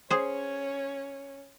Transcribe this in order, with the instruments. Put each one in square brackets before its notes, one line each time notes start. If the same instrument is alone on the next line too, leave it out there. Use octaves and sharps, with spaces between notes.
[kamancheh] C#4 C#5 [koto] G#4 C5